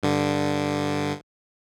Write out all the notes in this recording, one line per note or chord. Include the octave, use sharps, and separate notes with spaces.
G2 D3